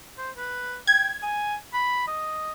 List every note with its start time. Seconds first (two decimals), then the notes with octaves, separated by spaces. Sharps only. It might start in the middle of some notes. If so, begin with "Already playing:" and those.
0.18 C5
0.37 B4
0.87 G5 G#6
1.23 G#5
1.74 B5
2.07 D#5